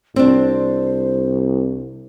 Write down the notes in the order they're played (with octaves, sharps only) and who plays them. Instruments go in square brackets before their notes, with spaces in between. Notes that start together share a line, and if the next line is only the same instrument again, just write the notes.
[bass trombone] C2 [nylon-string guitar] C4 D4 [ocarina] C5